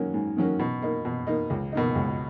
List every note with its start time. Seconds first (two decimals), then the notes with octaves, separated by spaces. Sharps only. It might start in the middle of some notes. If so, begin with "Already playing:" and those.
Already playing: G#2 D#3 F#3 A#3 C#4
0.14 G#2
0.37 D#3 F#3 A#3 C#4
0.59 B2
0.82 A#3 D#4
1.05 B2
1.27 A#3 D#4
1.50 C#2
1.72 B2 A#3 D#4
1.95 C#2